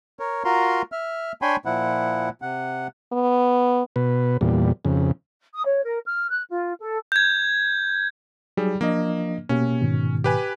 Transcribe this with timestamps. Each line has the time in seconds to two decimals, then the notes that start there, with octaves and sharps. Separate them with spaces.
0.19 A#4 C#5
0.45 F4 F#4 A#4 A#5 C6
0.92 E5 F6
1.42 D4 C#5 G5 G#5 B5 C6
1.65 A#2 F3 E4 F#5
2.42 C3 F#5
3.12 B3
3.96 B2 B4
4.41 E2 A#2 G3
4.85 F2 C#3
5.53 D#6
5.66 C#5
5.84 A#4
6.05 F6
6.31 F#6
6.49 F4
6.81 A4
7.12 G6 G#6
8.57 F#3 G3 D#4 G#4
8.81 F3 A#3 D4 D#5
9.49 B2 A#3 C#4 G4
9.81 G#2 B2 D#3
10.24 G4 B4 G#5